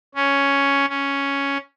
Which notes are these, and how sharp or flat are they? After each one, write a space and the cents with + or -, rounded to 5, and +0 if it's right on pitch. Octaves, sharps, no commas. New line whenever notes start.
C#4 +5
C#4 +5